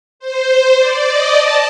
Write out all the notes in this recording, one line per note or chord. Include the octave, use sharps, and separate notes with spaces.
C5
D5
D#5
A5